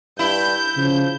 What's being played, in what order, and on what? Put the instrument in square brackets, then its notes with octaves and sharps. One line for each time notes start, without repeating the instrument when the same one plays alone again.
[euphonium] G2 [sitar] E4 [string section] G6
[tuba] C#3 [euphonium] F3